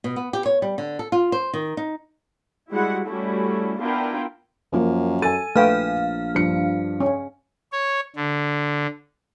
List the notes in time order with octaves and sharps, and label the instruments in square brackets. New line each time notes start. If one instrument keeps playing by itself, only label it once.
[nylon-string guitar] B2
B3
G4
C#5
G3
D3
A4
F4
C5
D#3
D#4
[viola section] G3 G#3 E4 F#4 F#5
G3 A3 C#4 E4 F#4 A4
B3 D4 E4 F4 A#4 G5
[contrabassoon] F#2 [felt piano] F3 A#3 A#4
[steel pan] A4 [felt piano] G#5 A6 [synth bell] D#7
[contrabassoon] A#1 [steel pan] A3 B4 G5 [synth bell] F5 F6
[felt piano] G2 F3 C#7
[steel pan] C#4
[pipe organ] C#5
D3